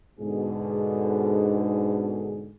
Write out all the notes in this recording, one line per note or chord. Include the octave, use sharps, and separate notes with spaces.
G#2 B2 D3 G#4